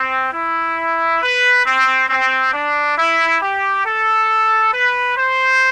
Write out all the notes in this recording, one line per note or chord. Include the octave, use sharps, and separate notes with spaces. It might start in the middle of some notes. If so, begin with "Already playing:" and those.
Already playing: C4
E4
B4
C4
C4
D4
E4
G4
A4
B4
C5